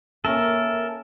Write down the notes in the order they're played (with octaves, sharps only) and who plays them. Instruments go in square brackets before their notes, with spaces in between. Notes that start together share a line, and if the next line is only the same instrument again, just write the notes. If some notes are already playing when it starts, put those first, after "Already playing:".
[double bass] A#3 C#4 [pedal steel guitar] A4 A#4 [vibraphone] E5